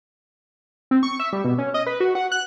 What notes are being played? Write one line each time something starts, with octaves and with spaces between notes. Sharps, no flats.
C4
C#6
E5
G3
B2
C#4
D#5
B4
F#4
F#5
F#6